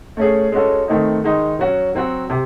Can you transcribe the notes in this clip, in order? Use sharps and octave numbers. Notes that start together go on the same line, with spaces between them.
A3 C#4 G#4
G#3 C#4 F#4 A4
D#3 A3 C4 D#4
D#3 G#3 D#4
F#3 C#4 F#4
F#3 C4 F#4
C3